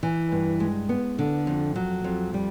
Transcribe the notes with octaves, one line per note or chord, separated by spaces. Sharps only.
E3
G2
G#3
B3
D3
F2
F#3
F2
G3